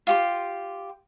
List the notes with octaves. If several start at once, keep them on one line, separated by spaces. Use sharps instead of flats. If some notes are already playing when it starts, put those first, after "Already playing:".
F4 G4 C6